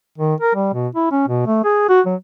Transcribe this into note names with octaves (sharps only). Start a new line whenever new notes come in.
D#3
A#4
G3
B2
E4
C#4
B2
A3
G#4
F#4
F#3